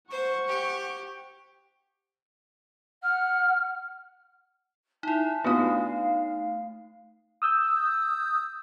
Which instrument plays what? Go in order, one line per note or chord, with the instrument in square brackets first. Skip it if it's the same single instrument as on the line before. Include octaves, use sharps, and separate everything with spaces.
[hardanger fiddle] C5 [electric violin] F#5 C#6
[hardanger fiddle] G4
[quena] F#5 [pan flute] F6
[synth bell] D#4 E4 [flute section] E5 A5
[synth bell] A3 D#4 [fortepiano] B3 D#6 [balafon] D4 F4 F#4 [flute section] F5
[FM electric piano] D#6 E6 G6